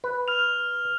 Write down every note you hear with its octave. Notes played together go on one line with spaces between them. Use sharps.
B4
F6 F7